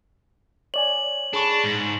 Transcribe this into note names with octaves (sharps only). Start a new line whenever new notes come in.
C#5 D5 G#5 F#7
D4 G#4 B5 C#6
G#2